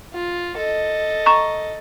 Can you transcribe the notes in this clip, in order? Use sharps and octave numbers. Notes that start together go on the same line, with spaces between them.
F4
A4 D#5
A#5 C#6 E7